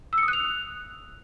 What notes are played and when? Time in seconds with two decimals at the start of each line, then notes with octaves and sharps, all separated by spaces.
0.13 E6
0.18 C#7
0.23 D#6
0.28 F#6
0.33 F7